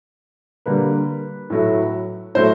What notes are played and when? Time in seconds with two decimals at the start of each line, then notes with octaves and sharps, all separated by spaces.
0.66 D3 G3 A#3 B4
1.50 A2 F#3 A3
2.35 A2 F#3 A3 C5